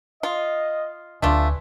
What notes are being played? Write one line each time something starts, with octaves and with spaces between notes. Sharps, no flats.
F4 D#5
D1 D2 A3 D4 F4 B4 D5 G#5